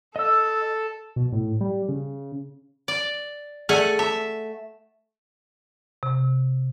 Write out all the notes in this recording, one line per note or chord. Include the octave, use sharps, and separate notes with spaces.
A4 D#5 E6
B2
A2
G3
C#3
D5
A3 G#4 D5 F#5 G#5
E5 A5
C3